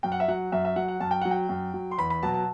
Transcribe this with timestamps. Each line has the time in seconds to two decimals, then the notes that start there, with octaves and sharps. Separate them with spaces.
0.03 F#2 G5
0.12 F#5
0.20 E5
0.28 F#3 F#5
0.52 F#2 E5
0.65 E5
0.76 F#3 F#5
0.88 F#5
1.00 F#2 A5
1.11 G5
1.21 F#3 F#5
1.31 G5
1.49 F#2
1.74 F#3
1.91 C6
1.98 E2 B5
2.10 B5
2.23 B2 F#3 A5
2.34 A5